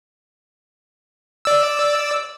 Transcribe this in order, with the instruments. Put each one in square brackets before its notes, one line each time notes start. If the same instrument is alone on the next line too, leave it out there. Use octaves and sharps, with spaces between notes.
[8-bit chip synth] D5 E6